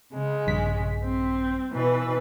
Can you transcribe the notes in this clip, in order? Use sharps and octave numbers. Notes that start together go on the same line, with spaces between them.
C#3 G#3
A#1 G2 B6
C4
B2 E3 B4